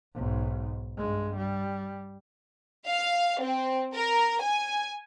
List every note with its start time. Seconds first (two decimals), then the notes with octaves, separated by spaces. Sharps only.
0.14 B1 G#2
0.97 G2 G#3
1.37 G3
2.87 F5
3.41 C4
3.94 A#4
4.42 G#5